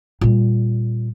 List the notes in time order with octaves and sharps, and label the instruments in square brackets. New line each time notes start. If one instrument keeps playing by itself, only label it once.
[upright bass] A#2 G3